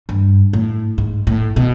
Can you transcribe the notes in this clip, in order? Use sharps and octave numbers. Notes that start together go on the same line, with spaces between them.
G2
A2
G#2
A2
B2